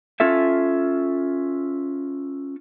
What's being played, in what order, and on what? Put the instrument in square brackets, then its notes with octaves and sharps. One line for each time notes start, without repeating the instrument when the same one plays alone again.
[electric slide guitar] C#4 F4 A4 E5